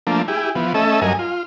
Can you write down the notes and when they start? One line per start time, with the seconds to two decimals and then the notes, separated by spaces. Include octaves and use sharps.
0.07 F3 A3 A#3 D4
0.28 E4 G4 G#4
0.55 E3 F3 B3
0.74 A3 C#4 A4 D#5 E5
1.02 G2 F#3 A#4 D#5 G#5
1.19 F4